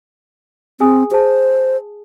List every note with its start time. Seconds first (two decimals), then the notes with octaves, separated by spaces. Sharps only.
0.80 C4 G#4 G#5 D#6
1.11 G#4 C5 A5